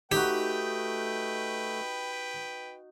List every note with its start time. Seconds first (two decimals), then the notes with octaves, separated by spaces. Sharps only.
0.12 A3 D#4 F#4 G4 B4 G5